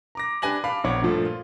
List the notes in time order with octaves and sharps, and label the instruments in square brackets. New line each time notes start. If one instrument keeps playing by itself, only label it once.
[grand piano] A#5 D6 A#6
D4 G4 B4 G#5 A#6 F#7
F5 A5 B5 D6
A#1 B3 C#5 F#5 D6
G2 A#2 F3 A3
F4